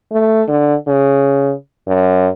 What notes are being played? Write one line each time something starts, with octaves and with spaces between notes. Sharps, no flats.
A3
D3
C#3
F#2